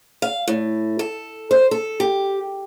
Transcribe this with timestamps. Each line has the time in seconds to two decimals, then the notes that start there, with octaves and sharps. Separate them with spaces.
0.22 F5
0.48 A2
0.99 A4
1.51 C5
1.71 A4
2.00 G4